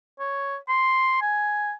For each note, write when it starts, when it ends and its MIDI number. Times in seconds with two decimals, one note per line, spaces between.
0.20 0.56 73
0.69 1.19 84
1.22 1.72 80